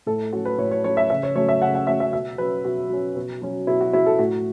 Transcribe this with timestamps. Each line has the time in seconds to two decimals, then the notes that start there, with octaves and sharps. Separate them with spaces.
0.06 A2 A4
0.33 F#3 C#4 F#4
0.45 B4
0.58 A2 C#5
0.71 C#5
0.84 F#3 C#4 C#5
0.97 E5
1.10 C#3 E5
1.23 C#5
1.35 F#3 A3 C#4 C#5
1.49 E5
1.61 C#3 F#5
1.75 F#5
1.87 F#3 A3 C#4 E5
2.00 E5
2.13 B2 E5
2.38 F#3 C#4 B4
2.65 B2 F#4
2.90 F#3 C#4
3.16 B2
3.42 F#3 C#4
3.67 B2 E4
3.81 F#4
3.93 F#3 C#4 E4
4.06 A4
4.19 A2 F#4